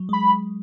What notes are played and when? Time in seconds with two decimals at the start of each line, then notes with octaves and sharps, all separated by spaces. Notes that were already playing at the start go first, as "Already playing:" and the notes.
Already playing: F#3
0.09 G#3 B5